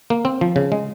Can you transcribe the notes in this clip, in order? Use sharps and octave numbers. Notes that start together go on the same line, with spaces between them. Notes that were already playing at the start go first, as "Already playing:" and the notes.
A#3
C4
F3
C#3
G#3